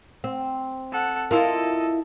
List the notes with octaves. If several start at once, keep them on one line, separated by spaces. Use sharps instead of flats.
C4
A4 F#5
E4 F4 A4 A#4 D#5